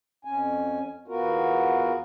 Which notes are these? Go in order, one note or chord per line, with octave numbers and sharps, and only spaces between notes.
F2 C#4 G#5
E2 B3 F4 F#4 A#4